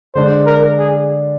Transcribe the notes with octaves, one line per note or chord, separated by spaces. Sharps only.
D3 G#3 D4 C5
A#4
G#4